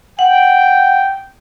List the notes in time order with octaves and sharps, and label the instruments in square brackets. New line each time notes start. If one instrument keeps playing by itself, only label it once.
[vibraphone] F#5 [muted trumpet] G5